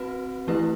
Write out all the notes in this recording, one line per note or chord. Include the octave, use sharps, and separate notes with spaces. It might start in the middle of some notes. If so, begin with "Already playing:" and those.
Already playing: C4 F#4 B4
E3 A3 E4 G4 B4